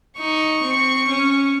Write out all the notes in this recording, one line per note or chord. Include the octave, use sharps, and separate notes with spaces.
D#4 C#6
C4
C#4